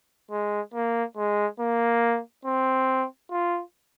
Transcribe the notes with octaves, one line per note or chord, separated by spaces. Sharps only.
G#3
A#3
G#3
A#3
C4
F4